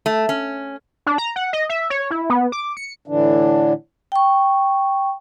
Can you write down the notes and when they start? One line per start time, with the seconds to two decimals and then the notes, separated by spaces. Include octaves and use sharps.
0.06 A3
0.29 C#4
1.07 D4
1.18 A#5
1.36 F#5
1.53 D#5
1.69 E5
1.90 C#5
2.11 E4
2.30 B3
2.52 D6
2.77 C#7
3.08 A2 D3 E3 D4
4.12 G5 C#6